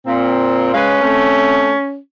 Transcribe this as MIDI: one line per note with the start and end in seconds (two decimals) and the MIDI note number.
0.06 0.72 46
0.06 0.72 60
0.74 0.99 56
0.74 1.97 61
0.74 0.99 71
0.74 0.99 77
1.02 1.71 57
1.02 1.71 60